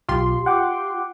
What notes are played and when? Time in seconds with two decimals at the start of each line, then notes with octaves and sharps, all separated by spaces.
0.09 B1 F4 G4 C6
0.46 F#5 G5 D6